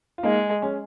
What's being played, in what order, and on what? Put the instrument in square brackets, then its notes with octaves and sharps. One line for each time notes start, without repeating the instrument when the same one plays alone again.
[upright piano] F4
[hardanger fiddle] G#3 [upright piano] A#3 D#4
[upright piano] G#3 C#4